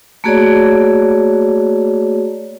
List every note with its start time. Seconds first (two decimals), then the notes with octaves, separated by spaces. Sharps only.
0.24 A3 A#3 F#4 G#4 C#5 D5